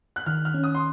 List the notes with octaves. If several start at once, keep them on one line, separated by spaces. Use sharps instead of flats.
F#6
D#3 F6
F6
C#4
D#6
C6